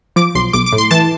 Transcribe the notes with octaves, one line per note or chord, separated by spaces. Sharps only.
F3 D6
B1 C6
B1 D6
D6
A2
C6
E3 A5